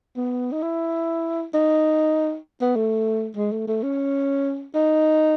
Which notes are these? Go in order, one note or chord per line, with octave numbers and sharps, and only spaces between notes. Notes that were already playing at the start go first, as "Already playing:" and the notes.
B3
D#4
E4
D#4
B3
A3
G#3
A3
A3
C#4
D#4